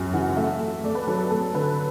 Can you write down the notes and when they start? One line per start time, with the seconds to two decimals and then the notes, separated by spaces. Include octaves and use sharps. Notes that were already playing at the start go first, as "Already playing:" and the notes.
Already playing: C#2 F#2 G#5
0.13 E3 F#5
0.36 A3 E5
0.60 A3
0.84 A3 D5
0.95 B4
1.07 F#3 A4
1.19 A4
1.31 A3 A4
1.54 D3 B4